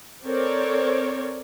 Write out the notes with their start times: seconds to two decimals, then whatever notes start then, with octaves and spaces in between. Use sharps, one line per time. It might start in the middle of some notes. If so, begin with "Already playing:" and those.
0.25 C4 A4 A#4 C#5 D5